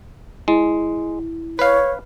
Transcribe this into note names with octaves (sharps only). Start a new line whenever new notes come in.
G#3 E4
B4 C#5 F5